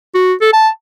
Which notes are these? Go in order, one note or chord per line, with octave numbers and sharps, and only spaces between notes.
F#4
A4
A5